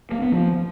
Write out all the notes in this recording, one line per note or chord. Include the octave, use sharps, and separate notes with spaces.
A#3
B3
F3